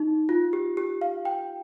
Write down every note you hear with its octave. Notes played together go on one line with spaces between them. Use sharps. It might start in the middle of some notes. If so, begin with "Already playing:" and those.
Already playing: D#4
F4
G4
G4
F5
G5